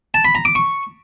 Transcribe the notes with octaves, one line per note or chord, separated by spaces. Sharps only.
A5
B5
A#5
D6
C#6